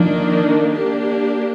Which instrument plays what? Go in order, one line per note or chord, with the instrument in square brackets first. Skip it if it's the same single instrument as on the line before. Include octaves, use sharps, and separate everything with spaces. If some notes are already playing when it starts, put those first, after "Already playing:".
Already playing: [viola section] D#3 A#3 D4 [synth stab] F3
[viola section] A#3 D4 G4